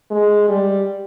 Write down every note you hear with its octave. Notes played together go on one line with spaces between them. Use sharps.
G#3
G3